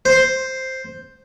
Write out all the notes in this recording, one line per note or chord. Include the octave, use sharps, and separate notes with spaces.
C5